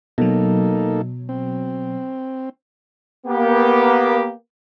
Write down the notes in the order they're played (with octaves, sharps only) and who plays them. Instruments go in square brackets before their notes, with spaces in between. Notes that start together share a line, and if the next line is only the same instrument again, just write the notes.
[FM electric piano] B2 F#3 [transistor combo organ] A#3 D#4 A4
[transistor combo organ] C4
[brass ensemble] A#3 B3 G4